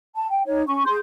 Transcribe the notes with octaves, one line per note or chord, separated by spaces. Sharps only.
A5
G5
D#4 C#5
C#4 C#6
G#4 C6 G6